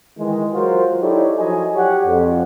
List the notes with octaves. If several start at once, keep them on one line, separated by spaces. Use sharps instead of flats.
D#3 E3 G#3
F#3 F4 F#4 A#4 C5
D#4 E4 G4 A4 C#5 D5
F3 F#3 E4 D#5 G#5
F#4 G4 C#5 D5 F#5
F2